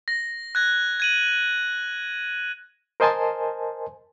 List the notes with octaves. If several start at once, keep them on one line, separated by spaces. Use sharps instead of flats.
A#6
F#6 G#6 A#6
G#6 D#7 F#7
A#4 C5 D#5 G#5 A5 C6